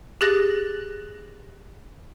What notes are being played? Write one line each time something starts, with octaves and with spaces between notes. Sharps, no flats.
G4 G#4 F#6 A6 A#6